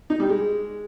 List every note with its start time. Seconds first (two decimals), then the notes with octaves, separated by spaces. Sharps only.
0.10 D#4
0.20 G3
0.29 G#3